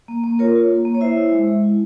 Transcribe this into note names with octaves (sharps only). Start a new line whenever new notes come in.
A#3
A#3
F4 A#4 C#5
F4
A#3
A#3
C#5
E4 C5 E5
E4
G#3
G#3
E4